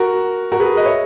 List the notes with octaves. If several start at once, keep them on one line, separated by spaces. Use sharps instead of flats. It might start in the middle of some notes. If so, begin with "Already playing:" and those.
Already playing: F#4 A#4
F#4 A#4
G#4 B4
B4 D#5
C#5 E5